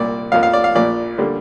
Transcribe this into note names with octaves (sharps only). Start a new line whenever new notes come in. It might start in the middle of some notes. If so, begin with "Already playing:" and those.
Already playing: C2 A#2 A#3 D5
F2 F3 A#3 F5
F5
D5
F5
A#1 A#2 A#3 D5
D3 G3 A#3